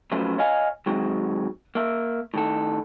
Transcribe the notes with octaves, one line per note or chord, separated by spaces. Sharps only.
F3 F#3 A3 C#4 B4 C5
C#5 D#5 F5 G#5
D#3 F#3 G#3 C4
A#3 E5
A2 D#3 A4